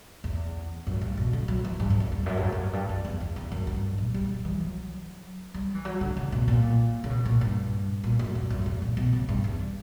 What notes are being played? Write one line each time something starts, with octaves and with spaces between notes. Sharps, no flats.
E2
F#2
G2
B2
D3
F#3
E3
G2
F#2
F#2
E2
F#2
G2
F#2
G2
F#2
G2
F#2
E2
E2
E2
F#2
G2
A#2
G3
E3
F#3
G3
E3
F#3
D3
C#3
B2
A#2
C#3
B2
A#2
G2
A#2
F#2
E2
F#2
E2
A#2
B2
C#3
G2
E2